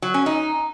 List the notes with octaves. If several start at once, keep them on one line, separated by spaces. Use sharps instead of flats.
F#3
C#4
D#4